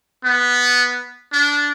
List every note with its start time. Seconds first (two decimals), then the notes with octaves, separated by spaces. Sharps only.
0.24 B3
1.32 D4